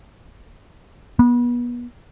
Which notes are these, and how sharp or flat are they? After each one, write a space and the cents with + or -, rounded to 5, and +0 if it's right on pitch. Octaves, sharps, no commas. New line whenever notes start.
B3 -30